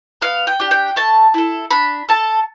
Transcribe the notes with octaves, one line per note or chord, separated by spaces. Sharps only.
B3 F5
G5
D4 G4
G5
A3 A5
E4 A4
D4 B5
A4 A5